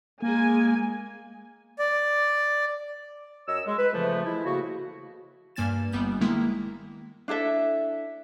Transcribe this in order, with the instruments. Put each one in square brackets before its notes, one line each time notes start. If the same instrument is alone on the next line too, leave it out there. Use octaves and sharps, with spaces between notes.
[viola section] G#3 G#5 [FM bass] A#3
[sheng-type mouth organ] D5
[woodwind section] F#2 C#5 D#5 E6
G#3
B4
F2 C#3 E3 F3 A3
G#3 E4
A2 C#3 A#3 F#4
[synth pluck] G2 A#3 G#5 A6 E7
G1 G3 B3 G6
D#3 G#3 A#3 E4
[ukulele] D4 E4 A4 E5